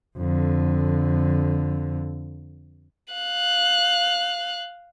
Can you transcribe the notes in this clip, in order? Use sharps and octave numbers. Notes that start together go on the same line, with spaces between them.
F2 D3
F5 F#6